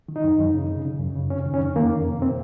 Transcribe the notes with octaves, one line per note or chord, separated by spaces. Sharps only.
D#3
D#4
F#2
F#2
C#3
C#3
C#3
F#2
C#3
F2 C#4
D#3
C#4
F2
D#3 A#3
F2
C3
C3 C4